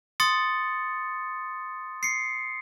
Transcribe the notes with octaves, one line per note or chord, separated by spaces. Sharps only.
C6 D#6 A6 C#7
C7 C#7